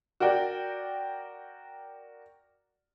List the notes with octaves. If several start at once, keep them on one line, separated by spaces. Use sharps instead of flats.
F#4 A#4 D5 G5